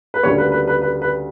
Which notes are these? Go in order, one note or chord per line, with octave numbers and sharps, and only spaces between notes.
B4
D2 C#3 G3 A#3 C#5
B4
B4
B4
B4
B4